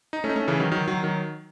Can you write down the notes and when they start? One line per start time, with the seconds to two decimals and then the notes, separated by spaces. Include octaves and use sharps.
0.13 D#4
0.24 A3 C#4
0.29 D#4
0.36 A3 C#4
0.48 C#3 E3
0.60 D#3 F#3
0.72 D#3 F#3
0.87 D#3 F#3
1.03 D#3 F#3